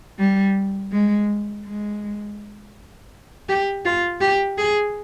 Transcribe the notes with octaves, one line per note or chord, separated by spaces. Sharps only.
G3
G#3
G#3
G4
F4
G4
G#4